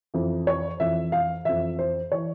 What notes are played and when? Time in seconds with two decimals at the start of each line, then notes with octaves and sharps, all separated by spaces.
0.14 F2 E3
0.47 C#5
0.80 F2 E3 E5
1.12 F5
1.45 F2 E3 E5
1.79 C5
2.12 E3 C#5